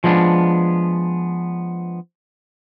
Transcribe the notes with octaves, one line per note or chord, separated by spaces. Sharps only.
F3 G#3 B3 D4